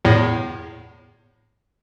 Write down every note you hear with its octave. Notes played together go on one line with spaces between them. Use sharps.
E2 A2